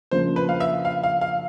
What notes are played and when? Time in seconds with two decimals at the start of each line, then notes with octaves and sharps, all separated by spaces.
0.11 C#3 F3 A#3 D4 C5
0.36 B4
0.49 F5
0.60 E5
0.85 F5
1.03 F5
1.21 F5